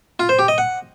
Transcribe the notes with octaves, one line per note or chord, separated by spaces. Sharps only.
F4
C5
G4
D#5
F#5